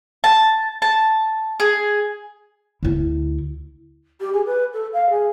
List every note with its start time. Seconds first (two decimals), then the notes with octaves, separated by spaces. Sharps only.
0.24 A5
0.82 A5
1.60 G#4
2.83 D2 E4
4.20 G4
4.33 G#4
4.46 B4
4.73 A4
4.93 F5
5.10 G#4